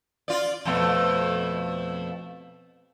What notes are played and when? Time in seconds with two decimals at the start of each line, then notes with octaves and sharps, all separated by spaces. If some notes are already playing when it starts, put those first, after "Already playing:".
0.28 F4 D5
0.65 F2 B2 A3